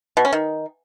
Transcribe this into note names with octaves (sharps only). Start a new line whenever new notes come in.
B2
C#4
D#3